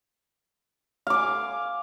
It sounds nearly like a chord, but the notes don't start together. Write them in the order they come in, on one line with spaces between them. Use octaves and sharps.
F5 D6 G#5